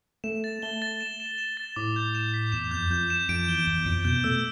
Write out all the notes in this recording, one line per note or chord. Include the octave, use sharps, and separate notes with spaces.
A3 E7
A6
A3 G7
A6
E7
E7
E7
A6
A2 D6
G6
E7
B6
E2 E7
F2 G6
F2 G6
E7
F2 D7
E2 G7
E2 D7
F2 D7
B2 G6
A3 E6